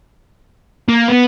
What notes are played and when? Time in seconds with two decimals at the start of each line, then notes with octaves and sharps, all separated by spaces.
0.89 A#3
1.09 B3